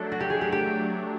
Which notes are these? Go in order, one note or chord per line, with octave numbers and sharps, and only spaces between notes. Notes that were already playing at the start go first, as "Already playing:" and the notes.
Already playing: F#3 A3 D4 A4
F#4
G4
G#4
G4
G4